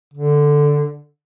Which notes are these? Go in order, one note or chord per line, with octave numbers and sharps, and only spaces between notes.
D3